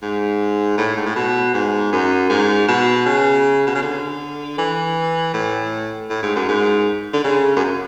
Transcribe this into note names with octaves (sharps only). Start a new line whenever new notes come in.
G#2
A2
G#2
A2
B2
G#2
F#2
G#2
B2
C#3
B2
C#3
D3
E3
A2
A2
G#2
F#2
G#2
D3
C#3
F#2